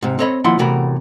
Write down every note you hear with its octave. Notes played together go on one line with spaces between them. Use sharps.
G#2 C3
C4 A4 C#5 D#5 B5
D#2 A#2 F3 E4 F#5 C6
E2 A2 C3 F#4 A#4 B5